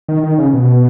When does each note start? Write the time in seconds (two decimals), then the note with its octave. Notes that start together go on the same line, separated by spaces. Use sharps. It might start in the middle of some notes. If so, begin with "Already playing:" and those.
0.08 D#3
0.24 D#3
0.38 C#3
0.54 B2